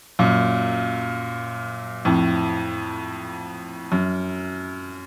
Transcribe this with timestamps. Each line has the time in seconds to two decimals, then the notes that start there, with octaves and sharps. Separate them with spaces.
0.19 F#2 A#2
2.05 F2 A2
3.92 F#2